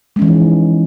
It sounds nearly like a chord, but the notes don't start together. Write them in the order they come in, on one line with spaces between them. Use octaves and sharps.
G#3 C#4 E3 F3 D#4